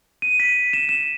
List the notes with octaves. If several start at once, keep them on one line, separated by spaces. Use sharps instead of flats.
D#7
B6
E7
E7